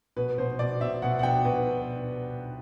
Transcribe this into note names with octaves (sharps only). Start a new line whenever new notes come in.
B2 B4
B2 C5
B2 D5
B2 E5
B2 F#5
F#5
B2 G5
B2 B4